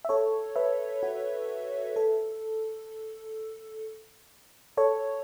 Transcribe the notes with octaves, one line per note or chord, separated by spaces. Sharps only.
E5
A4 C#5
B4 E5
F#4
A4
A4 C#5